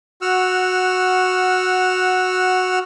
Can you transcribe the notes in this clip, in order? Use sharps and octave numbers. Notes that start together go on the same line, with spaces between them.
F#4 F#5 E6 F6